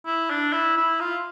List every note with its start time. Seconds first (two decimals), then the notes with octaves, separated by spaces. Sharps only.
0.06 E4
0.30 D4
0.53 E4
0.77 E4
1.01 F4